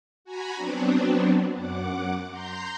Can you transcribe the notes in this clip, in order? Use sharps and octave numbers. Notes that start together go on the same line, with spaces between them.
F#4 G#5 A#5 B5
F#3 B3 C4 D4
F#2 F#5 D6
A#5 C6 G6